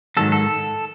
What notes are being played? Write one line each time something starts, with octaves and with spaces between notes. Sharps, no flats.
G#2 D#3 F#3 A4
A4